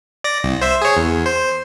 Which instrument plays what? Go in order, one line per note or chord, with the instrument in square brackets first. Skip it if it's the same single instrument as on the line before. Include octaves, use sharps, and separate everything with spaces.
[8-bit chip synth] D5 A#6
C2
C5 E5
G#4 C#5
E2
C5